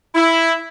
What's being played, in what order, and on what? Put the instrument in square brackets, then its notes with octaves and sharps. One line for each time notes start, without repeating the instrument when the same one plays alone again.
[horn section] E4